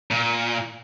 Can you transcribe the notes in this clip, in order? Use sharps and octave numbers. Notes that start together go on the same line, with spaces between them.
A#2